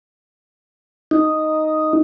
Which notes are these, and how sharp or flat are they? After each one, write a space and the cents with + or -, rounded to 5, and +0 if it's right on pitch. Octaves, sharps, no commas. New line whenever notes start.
D#4 +0